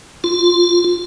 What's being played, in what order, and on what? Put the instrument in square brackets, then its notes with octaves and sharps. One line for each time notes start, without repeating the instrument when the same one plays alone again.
[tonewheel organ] F4